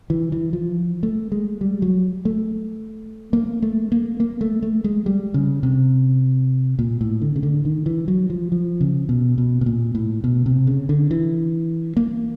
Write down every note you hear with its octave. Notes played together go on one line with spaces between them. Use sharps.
E3
E3
F3
A3
G#3
G3
F#3
A3
A#3
A3
A#3
A#3
A3
A3
G#3
G3
C#3
C3
A#2
A2
D3
C#3
D3
D#3
E3
F#3
F3
F3
C#3
B2
B2
B2
A#2
A2
B2
C3
C#3
D3
E3
A#3